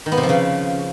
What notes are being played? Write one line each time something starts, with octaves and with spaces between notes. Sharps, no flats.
D#3
B3
C3
F3
C#3